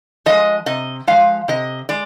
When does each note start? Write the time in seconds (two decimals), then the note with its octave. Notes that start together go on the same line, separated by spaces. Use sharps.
0.26 F3 G#3 D#5
0.66 C3 D#5
1.07 F3 G#3 F5
1.48 C3 D#5
1.89 G#3 D5